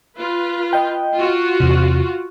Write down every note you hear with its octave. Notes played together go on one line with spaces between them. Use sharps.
F4 B4
D#5 G5
F4 F#4
E2 C3